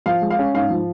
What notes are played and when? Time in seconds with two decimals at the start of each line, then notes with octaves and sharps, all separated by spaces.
0.06 F3 F5
0.22 G#3
0.30 F5
0.39 C#4
0.54 G#2 F5
0.70 F3